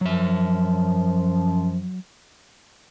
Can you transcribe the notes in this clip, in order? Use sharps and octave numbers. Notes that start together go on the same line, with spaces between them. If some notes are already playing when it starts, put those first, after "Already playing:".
F#2 F3 F#3 E5